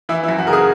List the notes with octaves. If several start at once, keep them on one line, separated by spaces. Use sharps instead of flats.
E3 E4
E4
F#2
F#4
C#3 A#4
G#4